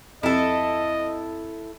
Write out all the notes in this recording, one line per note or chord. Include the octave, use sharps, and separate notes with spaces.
F2 E4 A4 D#5